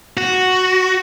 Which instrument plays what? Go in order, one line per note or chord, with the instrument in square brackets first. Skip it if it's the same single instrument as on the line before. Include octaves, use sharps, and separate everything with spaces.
[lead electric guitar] F#4